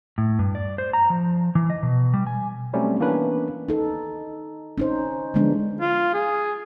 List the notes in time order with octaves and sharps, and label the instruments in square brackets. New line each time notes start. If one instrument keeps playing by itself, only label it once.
[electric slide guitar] A2
G2
D5
C5
A#5
F3
E3
D#5
B2
G3
G#5
[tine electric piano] F#3 G3 A3 C4 C#4
E3 A#3 B3 C#4 D4 B4
[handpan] D#4 A4
C#4 D#4 C5
D3 F3 F#3 G#3 B3 D4
[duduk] F4
G#4